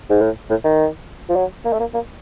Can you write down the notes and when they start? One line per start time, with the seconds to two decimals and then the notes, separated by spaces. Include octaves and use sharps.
0.10 G#2
0.21 A2
0.50 A2
0.65 D#3
1.29 F3
1.36 F#3
1.65 A#3
1.73 A3
1.80 A#3
1.94 A#3